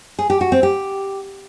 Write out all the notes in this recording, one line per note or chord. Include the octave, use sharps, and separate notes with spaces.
G#4
G4
F#4
C4
G4